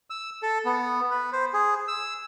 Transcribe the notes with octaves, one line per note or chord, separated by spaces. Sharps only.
E6
A4
B3
B4
C5
G#4
E6